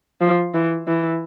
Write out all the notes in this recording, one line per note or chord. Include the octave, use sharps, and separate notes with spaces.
F3
E3
E3